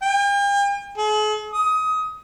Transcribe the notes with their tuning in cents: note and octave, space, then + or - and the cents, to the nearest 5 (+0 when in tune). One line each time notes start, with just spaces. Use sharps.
G5 +45
G#4 +45
D#6 +20